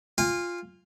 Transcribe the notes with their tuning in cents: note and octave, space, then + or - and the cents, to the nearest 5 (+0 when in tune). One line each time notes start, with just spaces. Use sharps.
F4 +0 G#5 -35